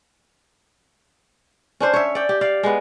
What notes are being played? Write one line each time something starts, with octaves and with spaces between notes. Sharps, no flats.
C#4 D4 C5
C#5 E5
D5 G5
G4
D5 F5
G#3 B3